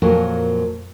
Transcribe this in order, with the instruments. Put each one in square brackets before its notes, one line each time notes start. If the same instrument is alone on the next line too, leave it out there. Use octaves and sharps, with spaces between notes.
[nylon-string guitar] F2 A#2 F#3 A#3 F4 A#4